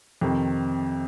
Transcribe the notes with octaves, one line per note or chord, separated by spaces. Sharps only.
F2 C3 D#3